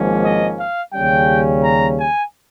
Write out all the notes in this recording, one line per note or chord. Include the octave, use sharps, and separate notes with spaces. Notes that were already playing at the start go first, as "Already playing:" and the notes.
Already playing: G#1 G#2 F3 A#3 C#4
D#5
F5
D#2 C#3 G3 C#4 G5
A#5
G#5